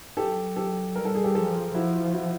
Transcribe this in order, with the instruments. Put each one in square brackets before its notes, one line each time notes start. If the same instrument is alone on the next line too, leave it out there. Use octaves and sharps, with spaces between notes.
[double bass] F#3 [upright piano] G4 A4
[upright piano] G4 A4
[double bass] G3 [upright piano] A#4
[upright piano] A4
G#4
G4 A4
[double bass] F3 [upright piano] G4 A4
[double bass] F3 [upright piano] E4 F#4
[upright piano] E4 F#4